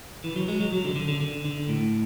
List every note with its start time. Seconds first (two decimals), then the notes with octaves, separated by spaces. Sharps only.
0.24 E3
0.36 F#3
0.48 G#3
0.60 F#3
0.72 F#3
0.84 D3
0.96 D3
1.08 D3
1.21 D3
1.45 D3
1.69 A2